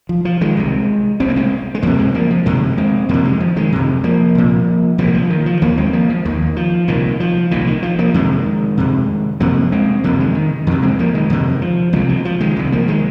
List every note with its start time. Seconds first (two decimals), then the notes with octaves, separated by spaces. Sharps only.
0.09 F3
0.25 F3
0.41 D#3 G#3
0.57 C2 C3
1.20 C2 C3 C4
1.29 A#3
1.36 G#3 C4
1.75 G#3
1.82 F2 C3 F3 A#3
1.99 G#3 C4
2.14 F3 A#3
2.31 F3
2.46 F2 C3 D#3 G#3
2.77 G#3 C4
3.09 F2 C3 F3 A#3
3.25 D#3 G#3
3.40 F3
3.56 D#3 G#3
3.72 F2 C3
4.04 F3 A#3
4.35 C2 A#2
4.98 C2 A#2 F3 A#3
5.07 G#3
5.14 F3
5.30 D#3
5.46 F3
5.62 D#2 F3 A#3
5.77 G#3 C4
5.93 F3 A#3
6.10 F3
6.25 D#2 D#3
6.56 F3
6.88 C2 A#2 D#3
7.20 F3
7.51 C2 A#2 D#3
7.67 D#3
7.82 F3
7.99 F3 A#3
8.14 F2 C3 D#3 G#3
8.77 F2 C3
9.40 F2 C3 F3 A#3
9.72 G#3 C4
10.04 F2 C3 F3 A#3
10.20 D#3 G#3
10.35 D#3
10.67 F2 C3 D#3
10.82 G#3 C4
10.99 F3 A#3
11.14 D#3 G#3
11.30 F2 C3 D#3
11.62 F3
11.93 C2 C3 D#3 G#3
12.09 F3
12.25 F3
12.41 D#3 G#3
12.56 C2 C3
12.72 F3 A#3
12.88 D#3 G#3